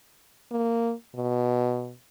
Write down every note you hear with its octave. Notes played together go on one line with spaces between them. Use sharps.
A#3
B2